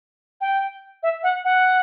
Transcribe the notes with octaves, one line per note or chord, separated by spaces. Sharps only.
G5
E5
F#5
F#5